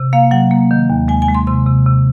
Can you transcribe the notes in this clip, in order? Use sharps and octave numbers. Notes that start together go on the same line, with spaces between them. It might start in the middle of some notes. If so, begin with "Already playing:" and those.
Already playing: C3
A#3 F5
F#3 F#5
A#3
D#3
D#2
G#3 G#5
G#5
G#3
C6
C3 C6
C3
C3